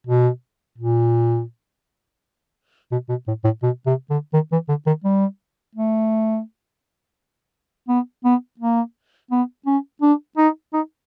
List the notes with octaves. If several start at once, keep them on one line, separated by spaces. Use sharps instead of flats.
B2
A#2
B2
B2
A2
A2
B2
C3
D3
D#3
E3
D3
D#3
G3
A3
B3
B3
A#3
B3
C#4
D4
D#4
D#4